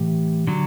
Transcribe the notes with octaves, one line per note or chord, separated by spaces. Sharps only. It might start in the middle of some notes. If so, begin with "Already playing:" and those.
Already playing: A2 E3 G4
D3 F#3